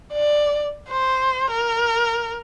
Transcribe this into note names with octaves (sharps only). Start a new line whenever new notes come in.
D5
C5
A#4